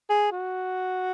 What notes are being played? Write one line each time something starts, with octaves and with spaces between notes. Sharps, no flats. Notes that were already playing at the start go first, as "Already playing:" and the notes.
G#4
F#4